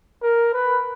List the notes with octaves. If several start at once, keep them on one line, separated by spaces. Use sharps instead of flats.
A#4
B4